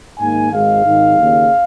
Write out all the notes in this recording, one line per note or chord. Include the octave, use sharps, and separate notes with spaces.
G#2 D#3 A#3 G#5
G#1 G#2 G#3 F5
G#1 G#2 D#3 G#3
D#2 C#3 A#3